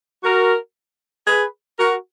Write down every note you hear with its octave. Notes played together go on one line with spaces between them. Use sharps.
F#4 A#4
G#4 B4
F#4 A#4